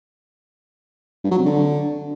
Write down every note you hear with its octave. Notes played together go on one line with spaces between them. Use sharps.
G2
F#3
C3
D3